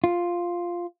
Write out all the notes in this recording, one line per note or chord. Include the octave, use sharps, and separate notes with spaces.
F4